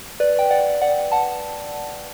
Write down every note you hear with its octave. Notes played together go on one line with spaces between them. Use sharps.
B4 D5
G5
D5 F#5
D5 F#5
F#5 A5